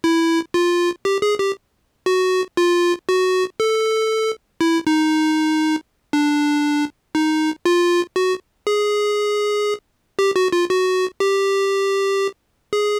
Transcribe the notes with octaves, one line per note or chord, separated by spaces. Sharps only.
E4
F4
G4
G#4
G4
F#4
F4
F#4
A4
E4
D#4
D4
D#4
F4
F#4
G#4
G4
F#4
F4
F#4
G4
G#4